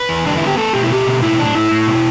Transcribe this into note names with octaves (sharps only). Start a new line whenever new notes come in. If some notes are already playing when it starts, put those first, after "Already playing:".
Already playing: B4
E2
D3 D4
B3 E4
G4
A3 A4
B2 G4
E4
A3 G4
B2
A2 E4
A2 D4
A2 E4
A2
B2